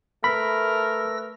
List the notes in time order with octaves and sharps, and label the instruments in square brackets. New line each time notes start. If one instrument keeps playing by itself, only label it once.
[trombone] A3 [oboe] A#4 [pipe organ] B4 E6 A#6 [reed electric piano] B5